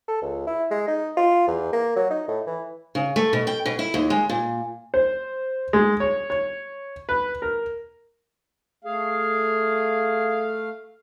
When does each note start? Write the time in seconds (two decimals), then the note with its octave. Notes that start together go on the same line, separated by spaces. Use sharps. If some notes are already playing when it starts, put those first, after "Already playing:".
0.08 A4
0.22 C#2
0.47 E4
0.71 G#3
0.88 D#4
1.17 F4
1.48 E2
1.73 A#3
1.96 F#3
2.11 D#4
2.28 A2
2.47 E3
2.95 C#3
3.16 A3
3.33 B2
3.47 G5
3.66 B2
3.79 E4
3.94 D#2
4.10 G#3
4.29 A#2
4.94 C5
5.73 G#3
6.00 C#5
6.30 C#5
7.09 B4
7.42 A#4
8.84 A3 G#4 F5